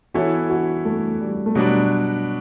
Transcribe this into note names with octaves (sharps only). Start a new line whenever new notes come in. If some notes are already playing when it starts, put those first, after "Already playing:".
E3 B3 E4 F#4 A4 C#5
F#4
A3
G3
A3
B2 F#3 G3 B3 D4